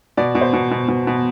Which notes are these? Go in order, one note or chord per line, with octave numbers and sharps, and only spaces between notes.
B2 D5
B2
C5
B2
B2
B2
B2